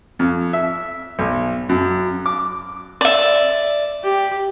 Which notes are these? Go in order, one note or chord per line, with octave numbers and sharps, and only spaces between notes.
F2
E5
B1
F#2
D6
D5 E5
G4